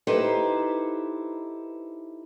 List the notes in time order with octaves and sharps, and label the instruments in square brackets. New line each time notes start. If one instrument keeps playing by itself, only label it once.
[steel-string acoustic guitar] D#4 E4 G4 A4 B4 C5